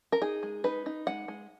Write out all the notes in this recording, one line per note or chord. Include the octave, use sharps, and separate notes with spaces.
A#4
D#4 G#4
G#3
D#4 B4
D#4
G#3 F#5
G#3